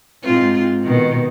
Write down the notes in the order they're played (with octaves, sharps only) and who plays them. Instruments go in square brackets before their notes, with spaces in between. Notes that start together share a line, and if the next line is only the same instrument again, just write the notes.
[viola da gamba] G#2 C4 F4
B2 D#3